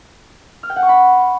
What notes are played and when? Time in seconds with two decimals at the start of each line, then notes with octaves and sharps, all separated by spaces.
0.63 F6
0.69 G5
0.76 F#5
0.82 C#6
0.89 B5